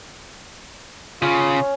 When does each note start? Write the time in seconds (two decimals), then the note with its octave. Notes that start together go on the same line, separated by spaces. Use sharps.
1.22 C#3 C#4 F4 C#5